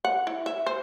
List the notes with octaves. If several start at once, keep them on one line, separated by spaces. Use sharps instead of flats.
F#5
E4
E5
C5